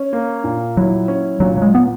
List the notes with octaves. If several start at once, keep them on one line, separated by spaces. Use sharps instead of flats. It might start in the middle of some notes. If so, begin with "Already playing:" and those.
Already playing: C#4
A#3
A#2
F#3 E4
C#4
A#2 F#3
F#3
G#3
B3